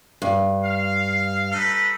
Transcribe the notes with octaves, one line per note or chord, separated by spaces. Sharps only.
G2
F5
D#4 A4 B4